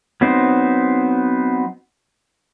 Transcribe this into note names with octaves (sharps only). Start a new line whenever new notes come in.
F#3 B3 C4 D#4 C5